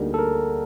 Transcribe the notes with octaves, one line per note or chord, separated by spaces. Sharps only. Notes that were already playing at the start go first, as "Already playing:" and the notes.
Already playing: D2 D3 G3 A#3 D#4 G#4
A4
A#4